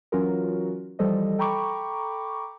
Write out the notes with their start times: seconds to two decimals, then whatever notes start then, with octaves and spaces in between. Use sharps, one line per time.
0.12 E3 F#3 C#4 F4 F#4 A#4
0.99 E3 F3 G3 A4 C5 D#5
1.38 A4 G5 A#5 B5 C#6 D6